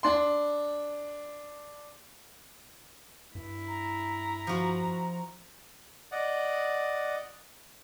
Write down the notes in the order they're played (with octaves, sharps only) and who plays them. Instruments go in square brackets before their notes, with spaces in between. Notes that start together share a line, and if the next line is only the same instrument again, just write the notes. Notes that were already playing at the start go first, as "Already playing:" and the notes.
[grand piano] D4 C6
[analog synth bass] G2 [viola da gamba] E4
[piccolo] A#5
[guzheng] F3 F#4
[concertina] D5 D#5 F#5